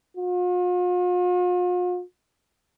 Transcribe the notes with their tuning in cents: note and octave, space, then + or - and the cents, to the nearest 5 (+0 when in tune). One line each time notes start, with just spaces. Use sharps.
F4 +45